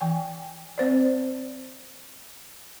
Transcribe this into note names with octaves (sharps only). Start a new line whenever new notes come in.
E3 G5 G#5
C4 C5 D5